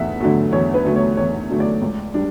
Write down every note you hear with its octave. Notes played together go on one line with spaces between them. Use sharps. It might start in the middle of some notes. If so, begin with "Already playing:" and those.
Already playing: E2 D3 A3 E5 F#5
D3 F#3 A3
E2 C#5
B4
D3 F#3 A3
C#5
E2 C#5
D3 F#3 A3
D5
C#2
G3 D4